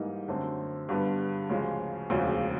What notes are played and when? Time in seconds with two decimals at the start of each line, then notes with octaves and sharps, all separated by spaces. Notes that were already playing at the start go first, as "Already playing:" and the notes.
Already playing: G#2 E3 G3 A#3 D#4
0.28 F#2 D3 F#3 A3 C4
0.89 G2 D3 G3 B3
1.50 D2 C#3 F3 G#3
2.10 E1 D2 C#3 F3